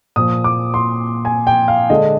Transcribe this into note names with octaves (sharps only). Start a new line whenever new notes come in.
A#2 F3 A#3 D#6
D6
C6
G#5
G5
F5
D3 G#3 D4 D#5